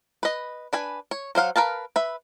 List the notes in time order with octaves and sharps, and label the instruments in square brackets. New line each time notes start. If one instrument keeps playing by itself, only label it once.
[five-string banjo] B4 D#5
D4 B4 G#5
C#5
F#3 C5 F5 F#5
A#4 B4 F5 A5
B4 E5